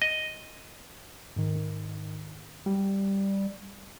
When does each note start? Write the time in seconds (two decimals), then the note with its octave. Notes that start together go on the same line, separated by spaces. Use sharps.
0.02 D#5
1.36 G#2 D#3
2.66 G3